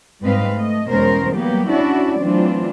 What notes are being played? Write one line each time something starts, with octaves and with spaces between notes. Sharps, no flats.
G#2 G3 C4 B4 D#5 F5
A3 D#5
E2 B2 G#3 C#4 A#4 C5
F#3 G3 A#3 B3 G4
C#4 D4 E4 F#4 D5
E3 F#3 A3 C4 D4 F4